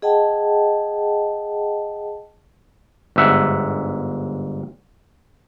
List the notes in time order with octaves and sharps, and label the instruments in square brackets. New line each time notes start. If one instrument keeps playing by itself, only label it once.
[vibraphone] G#4 D#5 F#5 G5 A5
[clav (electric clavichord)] G1 G#2 E5 F#5